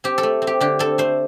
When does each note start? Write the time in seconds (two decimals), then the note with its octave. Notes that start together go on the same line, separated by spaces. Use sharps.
0.04 C4 G4
0.18 A4
0.23 A3
0.42 C4
0.47 G4
0.61 D3 G4
0.79 C4 A4
0.98 A3 C5